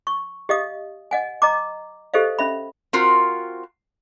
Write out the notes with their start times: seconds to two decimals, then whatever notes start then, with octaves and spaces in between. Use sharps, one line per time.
0.07 C#6
0.49 G4 D#5 F5 D#6
1.11 D#5 F#5 G#5
1.42 D#5 A#5 D6
2.14 G4 A4 C5 D#5 F5
2.39 C#4 E5 B5
2.93 C4 F4 F#4 A#4